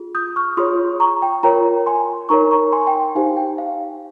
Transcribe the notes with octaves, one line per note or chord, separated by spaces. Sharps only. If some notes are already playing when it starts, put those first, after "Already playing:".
Already playing: F4 G#4
D#6 G6
C#6 F6
F4 G#4 C#5 C6 D#6
A#5 C#6
G5
F4 A#4 C#5 G5 A#5
G#5 C6
D#4 A#4 C#5 A#5 C#6
A#5 C#6
G#5 C6
G5
G5
D#4 G4 C5 F5 G#5
G5
F5